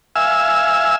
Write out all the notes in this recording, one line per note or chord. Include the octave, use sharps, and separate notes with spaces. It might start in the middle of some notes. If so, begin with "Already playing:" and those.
E5 F5 G#5 E6